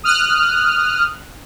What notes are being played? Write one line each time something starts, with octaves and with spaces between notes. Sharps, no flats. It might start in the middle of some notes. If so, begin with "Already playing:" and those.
D#6 F6 F#6